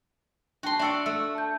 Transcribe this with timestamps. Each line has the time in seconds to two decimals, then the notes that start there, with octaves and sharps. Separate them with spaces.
0.63 D4 F#4 G5 A5 C6
0.79 D4 D5 E5 F#5 C#6 E6
1.06 A3 E6
1.35 A5 G6